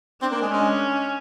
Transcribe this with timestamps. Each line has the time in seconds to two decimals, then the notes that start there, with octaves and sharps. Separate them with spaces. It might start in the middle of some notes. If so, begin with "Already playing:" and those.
0.22 C4 D4
0.32 A#3
0.42 G#3
0.52 G#3 C#4